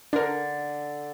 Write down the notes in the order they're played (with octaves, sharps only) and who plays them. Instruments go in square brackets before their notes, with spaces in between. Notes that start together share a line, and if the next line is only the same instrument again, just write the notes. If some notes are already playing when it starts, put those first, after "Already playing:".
[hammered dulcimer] D3 [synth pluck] D4 A#4